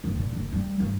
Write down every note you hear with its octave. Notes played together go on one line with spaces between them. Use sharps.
F#1
A#2
F#1
G3
G2